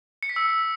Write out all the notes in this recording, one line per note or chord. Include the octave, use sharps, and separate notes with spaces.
C#7
B6
E6